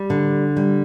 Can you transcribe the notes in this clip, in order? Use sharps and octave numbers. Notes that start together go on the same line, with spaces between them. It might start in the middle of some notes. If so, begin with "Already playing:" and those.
Already playing: G3
D3
G3